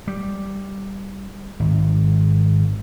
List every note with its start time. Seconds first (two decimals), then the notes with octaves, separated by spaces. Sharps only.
0.07 G3
1.60 G#1